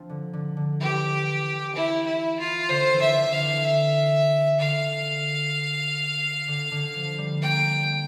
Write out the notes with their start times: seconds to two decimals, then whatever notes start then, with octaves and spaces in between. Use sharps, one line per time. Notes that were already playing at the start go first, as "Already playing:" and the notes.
Already playing: F3 C4 D4
0.09 D3
0.33 D3
0.57 D3
0.81 E3 G4
1.75 E4
2.06 E4
2.39 F4
2.69 D3 C5
2.93 E3
3.02 E5
3.17 D3
3.33 F5
3.41 D3
3.64 E5
4.59 D3 F5
6.48 D3
6.71 D3
6.96 F3
7.18 G3
7.42 A#3 G5